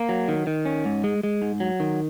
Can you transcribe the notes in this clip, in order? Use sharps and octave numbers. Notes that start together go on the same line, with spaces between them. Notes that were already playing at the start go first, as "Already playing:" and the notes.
Already playing: A#3
F#3
D#3
D#3
C#4
G#2
G#3
G#3
G#2
F#3
D#3